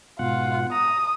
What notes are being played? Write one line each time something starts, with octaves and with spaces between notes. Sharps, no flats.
G#2 B2 F4 F#5
A#5 D#6